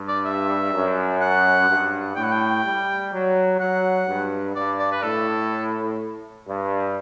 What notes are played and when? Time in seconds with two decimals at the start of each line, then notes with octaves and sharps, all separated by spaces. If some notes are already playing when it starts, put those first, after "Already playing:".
Already playing: G2
0.08 D5
0.25 E5
0.73 F#2
1.21 F#5
1.69 G2
2.16 A2 G5
2.24 F#5
2.32 G5
2.64 G3
3.12 F#3
3.59 F#3 F#5
4.08 G2
4.55 G2 D5
4.79 D5
4.92 B4
5.03 A2 A4
6.46 G2